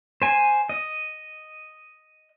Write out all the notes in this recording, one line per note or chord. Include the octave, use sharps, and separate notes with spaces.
C5 G#5
D#5